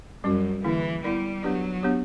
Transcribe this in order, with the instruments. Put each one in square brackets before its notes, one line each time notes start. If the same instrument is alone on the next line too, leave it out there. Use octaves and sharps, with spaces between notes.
[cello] F#2 [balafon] G3 C#4 F#4
[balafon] D3 A#3 E4 [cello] E3
[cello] G3 [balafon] B3 E4 A#4 D5
[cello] F#3 [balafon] B3 D4 G4 B4 D5
[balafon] B3 D4 G4 C#5